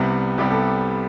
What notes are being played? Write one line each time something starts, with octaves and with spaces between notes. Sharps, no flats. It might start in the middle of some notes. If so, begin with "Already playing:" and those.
Already playing: C2 C3 G3 B3
C2 C3 G3 B3 G4
A4